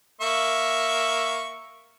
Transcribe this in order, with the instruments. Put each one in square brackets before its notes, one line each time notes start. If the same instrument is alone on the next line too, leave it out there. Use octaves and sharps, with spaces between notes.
[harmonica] A#3 E5 C#6